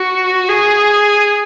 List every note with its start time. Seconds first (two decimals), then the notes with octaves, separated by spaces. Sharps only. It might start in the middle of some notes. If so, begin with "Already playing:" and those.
Already playing: F#4
0.49 G#4